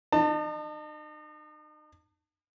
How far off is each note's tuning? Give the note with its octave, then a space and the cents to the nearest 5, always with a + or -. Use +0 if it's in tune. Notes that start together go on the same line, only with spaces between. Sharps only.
D#4 -40 A5 +30